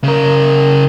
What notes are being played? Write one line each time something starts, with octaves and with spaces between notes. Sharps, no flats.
C#3 A#4